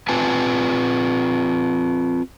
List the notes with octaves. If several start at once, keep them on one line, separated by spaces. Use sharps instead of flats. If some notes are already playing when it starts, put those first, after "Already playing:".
C4 F4 B4 G#5 A5